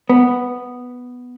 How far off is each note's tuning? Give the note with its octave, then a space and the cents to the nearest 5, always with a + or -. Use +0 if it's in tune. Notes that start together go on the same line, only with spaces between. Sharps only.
B3 +0